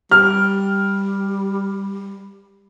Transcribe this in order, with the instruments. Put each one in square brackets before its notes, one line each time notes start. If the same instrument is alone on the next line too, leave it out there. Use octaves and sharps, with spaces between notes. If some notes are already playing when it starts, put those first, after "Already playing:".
[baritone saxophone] G3 [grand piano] F6